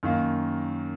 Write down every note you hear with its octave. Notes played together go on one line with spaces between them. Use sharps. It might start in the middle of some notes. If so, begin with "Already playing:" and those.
F#2 D#3 A#3